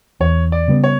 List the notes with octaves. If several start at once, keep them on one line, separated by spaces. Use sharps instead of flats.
E2 C#5
D5
C#3 G3 B3
C#5